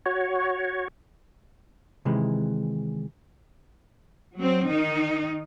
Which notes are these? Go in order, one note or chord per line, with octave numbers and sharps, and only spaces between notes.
F#4 C#5
C3 D#3 E3 G#3 B5
F#3 C4
D#3 D#4